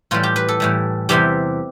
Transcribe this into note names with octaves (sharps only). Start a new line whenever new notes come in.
A2 E3 G3 F4
G4
B4
A4
A2 E3 G3
E2 C3 E3 G3 G4